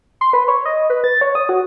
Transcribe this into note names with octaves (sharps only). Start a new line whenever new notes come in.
C6
B4
C#5
D#5
B4
A6
C#5
D#6
F#4